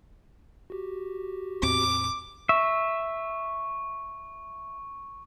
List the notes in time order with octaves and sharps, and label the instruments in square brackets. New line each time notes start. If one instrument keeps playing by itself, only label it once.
[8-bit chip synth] F#4 G4
[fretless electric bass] E2 A2 C4 [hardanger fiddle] D6
[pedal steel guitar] E5 [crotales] C#6